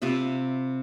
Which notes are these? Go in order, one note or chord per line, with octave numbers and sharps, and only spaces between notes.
C3 F4 B4 E5